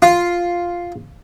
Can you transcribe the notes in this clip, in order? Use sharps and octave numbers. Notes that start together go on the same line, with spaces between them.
F4